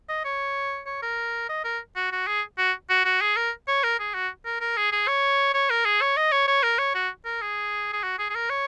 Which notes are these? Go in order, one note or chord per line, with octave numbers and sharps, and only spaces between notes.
D#5
C#5
C#5
A#4
D#5
A#4
F#4
F#4
G#4
F#4
F#4
F#4
G#4
A#4
C#5
A#4
G#4
F#4
A#4
A#4
G#4
G#4
C#5
C#5
A#4
G#4
C#5
D#5
C#5
C#5
A#4
C#5
F#4
A#4
G#4
G#4
F#4
G#4
G#4
A#4
C#5